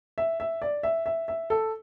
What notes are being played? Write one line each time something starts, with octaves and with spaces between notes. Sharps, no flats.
E5
E5
D5
E5
E5
E5
A4